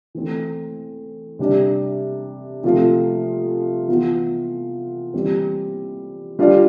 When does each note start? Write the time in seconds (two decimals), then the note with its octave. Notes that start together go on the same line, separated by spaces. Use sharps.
0.15 E3 A3 C4
1.39 C3 G3 D4
2.63 C3 F3 A3 C4 F4
3.88 E3 B3 F4
5.14 E3 G3 C4
6.39 G3 D4 F4